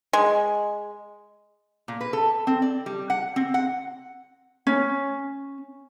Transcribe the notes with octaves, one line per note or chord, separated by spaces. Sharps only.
G#3
A#2
B4
A4
C4
D5
G3
F#5
C4
F#5
C#4